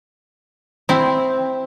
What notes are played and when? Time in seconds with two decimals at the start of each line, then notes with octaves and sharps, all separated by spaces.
0.89 C4 E4